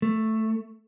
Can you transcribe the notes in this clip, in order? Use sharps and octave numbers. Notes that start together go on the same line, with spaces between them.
A3